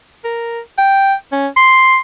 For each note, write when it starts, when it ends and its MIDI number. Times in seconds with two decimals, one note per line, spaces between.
0.24 0.60 70
0.78 1.14 79
1.32 1.47 61
1.56 1.97 84